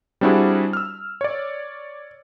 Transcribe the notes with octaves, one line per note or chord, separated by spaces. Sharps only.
G3 C4 D4 E4 F#4 G#4
E6 F6
C#5 D5